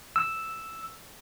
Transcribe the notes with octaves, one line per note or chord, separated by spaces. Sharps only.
E6